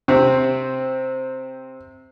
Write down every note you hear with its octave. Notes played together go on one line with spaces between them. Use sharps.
C3 C4